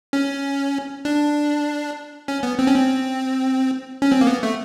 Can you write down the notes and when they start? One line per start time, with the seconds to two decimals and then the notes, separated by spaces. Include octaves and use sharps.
0.13 C#4
1.05 D4
2.28 C#4
2.43 B3
2.59 C4
2.67 C#4
2.75 C4
4.02 C#4
4.12 C4
4.21 A#3
4.27 B3
4.43 A3